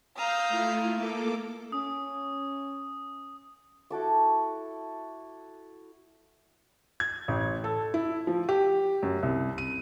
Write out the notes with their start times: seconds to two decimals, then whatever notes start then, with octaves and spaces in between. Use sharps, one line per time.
0.16 F5 A#5 D#6 E6 G6
0.49 A3 E4 F4
0.95 A#3 A4 D6
1.72 C#4 D#6
3.90 E4 F#4 A4 D6
7.00 G#6
7.28 A1
7.64 A4
7.94 E4
8.27 F3
8.49 G4
9.03 F#2
9.23 C2
9.58 D#7